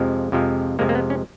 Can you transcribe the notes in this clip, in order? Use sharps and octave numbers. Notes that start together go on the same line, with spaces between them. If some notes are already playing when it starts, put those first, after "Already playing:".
Already playing: F2 C3 F3 G#3
F2 C3 F3 G#3
F2 C3 F3 G#3 A#3
A#3
B3
C#4